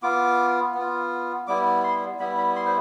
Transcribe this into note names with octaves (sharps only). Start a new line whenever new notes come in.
B3 F4 D6
B3 F4
G3 B3 E4 D6
C6
G3 B3 E4 B5
B5
C6
C5